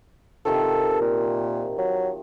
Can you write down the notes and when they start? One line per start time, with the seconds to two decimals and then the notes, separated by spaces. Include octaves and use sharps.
0.45 C3 D#3 F3 A4
1.01 A#2
1.78 F#3